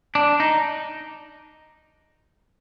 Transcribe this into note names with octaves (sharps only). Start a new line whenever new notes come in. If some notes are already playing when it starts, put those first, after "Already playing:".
D4
D#4